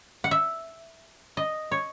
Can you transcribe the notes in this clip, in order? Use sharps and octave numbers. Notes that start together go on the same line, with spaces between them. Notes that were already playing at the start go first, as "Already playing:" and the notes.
F#5
E5
D#5
C#5